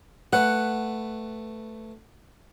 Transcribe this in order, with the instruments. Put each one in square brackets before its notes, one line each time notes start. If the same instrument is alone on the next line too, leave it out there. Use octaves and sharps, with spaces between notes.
[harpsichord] A3 B4 [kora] F#5